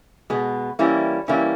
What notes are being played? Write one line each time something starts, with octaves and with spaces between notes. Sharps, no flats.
B2 G#3 B3
E3 G3 A#3 C#4 E4
E3 G3 A#3 C#4 E4